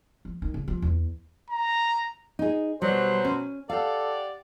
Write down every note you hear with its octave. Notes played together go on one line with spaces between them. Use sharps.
F3
D#3
C#3
F3
E2
A#5
D#4 G#4
B2 F#3 G3 C5
C#4
G4 A4 D5 F5 F#5